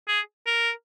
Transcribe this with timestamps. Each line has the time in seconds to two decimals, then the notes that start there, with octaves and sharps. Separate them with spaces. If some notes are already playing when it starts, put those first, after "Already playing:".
0.08 G#4
0.47 A#4